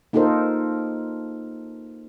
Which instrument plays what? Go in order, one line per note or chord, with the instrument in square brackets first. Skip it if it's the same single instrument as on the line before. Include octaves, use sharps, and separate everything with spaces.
[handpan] A#3 D#4 F4 A4 A#4 C5